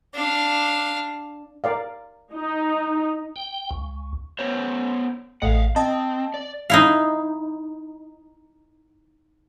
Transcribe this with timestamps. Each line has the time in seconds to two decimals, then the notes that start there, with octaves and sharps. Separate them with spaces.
0.14 D4 F5
1.64 A#4 D5 F5
2.33 D#4
3.36 G5
3.71 C#2
4.39 B3 C5 C#5
5.42 A1 A3 D#5 F5 F#5
5.76 C4 D#5 A5
6.34 D5
6.70 D#4 E4 F5